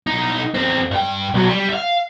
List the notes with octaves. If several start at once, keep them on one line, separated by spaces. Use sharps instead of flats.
B1 D#4
E2 C4
G2 G5
B1 F#3
G3
E5 F5